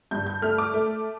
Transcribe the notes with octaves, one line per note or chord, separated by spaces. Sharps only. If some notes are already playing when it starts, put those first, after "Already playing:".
G2 G6
G6
A3 F6
D6
A3